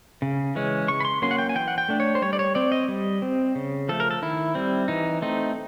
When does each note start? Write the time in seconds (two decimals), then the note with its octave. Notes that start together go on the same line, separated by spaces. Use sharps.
0.22 C#3
0.55 E3 G#3 C#4
0.88 C#3 C#6
1.00 B5
1.05 C6
1.22 F#3 A#3 C#4 C6
1.31 F#5
1.38 G5
1.49 G#5
1.55 E3 G5
1.68 F#5
1.78 G5
1.88 A3 D4
2.00 C#5
2.15 C5
2.22 G3 C#5
2.33 D5
2.39 C#5
2.55 C4 D5
2.72 D#5
2.88 G3
3.22 C4
3.55 C#3
3.89 F3 A3 A4
4.00 A#4
4.11 A4
4.22 D#3 E4
4.55 G3 C4
4.88 E3 D#4
5.22 A3 C4 D#4